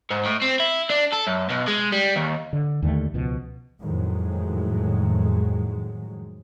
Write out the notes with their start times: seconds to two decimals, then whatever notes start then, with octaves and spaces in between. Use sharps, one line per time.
0.10 G#2
0.25 A2
0.42 C4
0.60 E4
0.90 D4
1.13 A4
1.28 F#2
1.50 B1
1.68 G#3
1.92 G3
2.16 D#2
2.53 D3
2.82 D#2 D3 A3
3.14 C#2 B2 F3
3.81 F2 A2 D#3 F#3 G#3